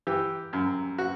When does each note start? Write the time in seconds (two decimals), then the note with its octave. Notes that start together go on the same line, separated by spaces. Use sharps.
0.07 E3 G4
0.53 F#2
0.98 F#4